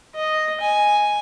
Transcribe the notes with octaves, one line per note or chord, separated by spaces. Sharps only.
D#5
G#5